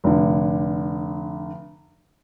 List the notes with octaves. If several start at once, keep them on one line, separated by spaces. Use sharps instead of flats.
F1 D3